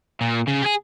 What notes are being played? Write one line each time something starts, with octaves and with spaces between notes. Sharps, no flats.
A#2
C#3
G4 G#4